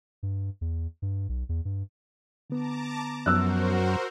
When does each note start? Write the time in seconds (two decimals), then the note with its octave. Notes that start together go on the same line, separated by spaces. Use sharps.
0.23 G2
0.61 E2
1.02 G2
1.29 B1
1.49 E2
1.65 G2
2.50 D3 B3 A5 A#5 D6
3.26 F#2 F3 B3 F#4 A#4 C5 E6 F#6